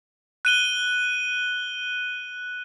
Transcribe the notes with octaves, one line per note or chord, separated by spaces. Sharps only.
F#6 D#7 G7